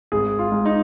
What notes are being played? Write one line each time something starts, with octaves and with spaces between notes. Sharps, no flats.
G#1 G#4
F4
G#2 G#3
D#4